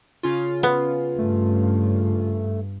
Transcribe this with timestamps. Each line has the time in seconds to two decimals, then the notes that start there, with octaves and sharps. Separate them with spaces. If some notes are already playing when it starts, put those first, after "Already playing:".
0.23 C#3 C#4 F4
0.63 B3
1.19 G2 A3